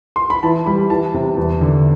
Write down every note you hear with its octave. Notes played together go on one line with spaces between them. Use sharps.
C6
B5
E3 A5
G3 B5
E3 A5
C3
E2
D3